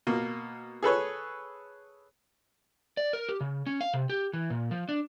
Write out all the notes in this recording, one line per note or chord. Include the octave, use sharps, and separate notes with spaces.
B2 A#3
G#4 A4 B4 C#5
D5
A#4
G4
C#3
C#4
F5
C3
G4
E3
A#2
F3
D4